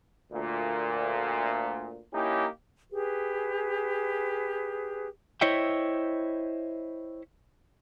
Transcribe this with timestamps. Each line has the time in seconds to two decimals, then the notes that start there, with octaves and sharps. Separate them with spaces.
0.32 D2 A#2
2.13 A#3 C#4 D#4 E4 G4
2.90 G4 G#4 B4
5.41 E4 C5 C#5 D#5 E5 G5